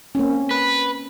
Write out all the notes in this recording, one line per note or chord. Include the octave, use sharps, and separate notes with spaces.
A#3 C4 C#4
B4